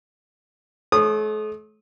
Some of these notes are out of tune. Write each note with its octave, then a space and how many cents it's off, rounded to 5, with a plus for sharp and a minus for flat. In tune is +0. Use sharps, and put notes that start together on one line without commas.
A3 -45 C#5 -15 D#6 -20